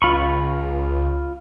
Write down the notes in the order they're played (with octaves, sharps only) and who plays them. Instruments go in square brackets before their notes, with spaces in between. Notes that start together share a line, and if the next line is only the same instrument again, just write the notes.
[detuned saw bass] C#2 [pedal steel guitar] F4 B5 C#6